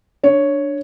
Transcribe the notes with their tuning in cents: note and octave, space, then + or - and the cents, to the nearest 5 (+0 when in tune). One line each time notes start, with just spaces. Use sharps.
D4 +0 C#5 +0